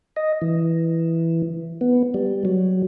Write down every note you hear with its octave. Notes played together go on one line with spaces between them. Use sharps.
D#5
E3
B3
G3
F#3